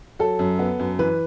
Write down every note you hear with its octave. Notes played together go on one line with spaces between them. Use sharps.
F#3 A4
F#2
B3
F#2
E3 B4